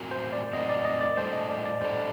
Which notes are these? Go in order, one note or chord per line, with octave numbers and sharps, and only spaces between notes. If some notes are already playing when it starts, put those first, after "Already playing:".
Already playing: A2 F#3 C4 F#4 A#4
C5
D5
A2 F#3 C4 F#4 A#4 D#5
D5
D#5
D5
A2 G3 D4 A4 C5
D#5
D5
D5
A2 G3 D4 A4 C5